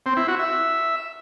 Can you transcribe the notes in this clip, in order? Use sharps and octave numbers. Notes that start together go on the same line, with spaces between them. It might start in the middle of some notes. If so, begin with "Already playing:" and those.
C4
E4
F#4
E5